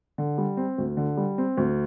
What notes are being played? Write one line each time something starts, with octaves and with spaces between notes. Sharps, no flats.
D3
G3
C4
D2
D3
G3
C4
D2